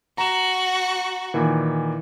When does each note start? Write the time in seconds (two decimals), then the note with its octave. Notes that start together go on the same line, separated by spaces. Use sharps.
0.18 F#4 A#5 E7
1.34 A#2 D#3 E3